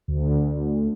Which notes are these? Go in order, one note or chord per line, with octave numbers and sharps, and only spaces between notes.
D2